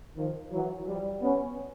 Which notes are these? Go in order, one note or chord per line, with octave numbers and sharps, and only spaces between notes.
D#3 F3
E3 F#3
F3 G3
B3 C#4